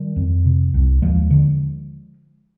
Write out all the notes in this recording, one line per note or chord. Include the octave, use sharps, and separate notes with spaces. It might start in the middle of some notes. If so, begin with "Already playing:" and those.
Already playing: D#3 G3
F2
C3
C2
D#2 F3 G#3
D3